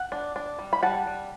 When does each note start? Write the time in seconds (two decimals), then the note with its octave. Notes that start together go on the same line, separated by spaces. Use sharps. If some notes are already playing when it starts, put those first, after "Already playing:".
Already playing: F#5
0.12 D4
0.36 D4
0.59 G3
0.73 B5
0.83 G3 F#5 A5
1.07 G3